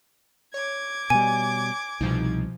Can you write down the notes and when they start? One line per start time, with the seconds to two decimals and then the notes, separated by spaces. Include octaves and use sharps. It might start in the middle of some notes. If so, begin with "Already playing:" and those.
0.54 C#5 D6 G#6
1.10 B2 G3 G#5
2.01 C2 B2 F3 D#4